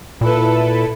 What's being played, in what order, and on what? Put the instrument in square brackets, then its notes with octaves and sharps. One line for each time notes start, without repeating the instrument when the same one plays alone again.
[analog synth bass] A#2 [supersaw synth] E4 A4 B4